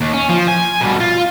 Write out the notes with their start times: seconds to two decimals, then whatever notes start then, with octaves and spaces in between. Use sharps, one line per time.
0.01 D#2
0.13 C#4
0.29 F3
0.48 G#5
0.81 B2 G3
1.00 F4